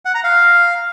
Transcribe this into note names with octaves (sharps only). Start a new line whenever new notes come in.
F#5
A#5
F5